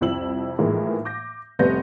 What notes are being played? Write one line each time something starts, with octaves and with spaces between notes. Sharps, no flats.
C2 F2 E4 E6 F#7
A2 E3 F3 G#3 A#3 D#4
D6 G6 A#6
F1 G3 A3 B3 G6 A#6